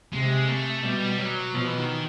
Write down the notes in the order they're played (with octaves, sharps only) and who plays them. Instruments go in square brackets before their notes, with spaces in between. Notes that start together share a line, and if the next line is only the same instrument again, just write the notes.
[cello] C3 [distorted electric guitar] G#3
[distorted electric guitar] A3
[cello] B2 [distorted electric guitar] G3
[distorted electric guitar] F#3
[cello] B2 [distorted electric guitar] F3
[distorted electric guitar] E3
D#3